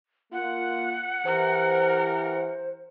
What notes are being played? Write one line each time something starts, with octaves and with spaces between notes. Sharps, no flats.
A#3 F4 F#5
E3 G4 A#4 C5